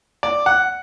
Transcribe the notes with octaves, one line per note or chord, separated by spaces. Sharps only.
D5
F#5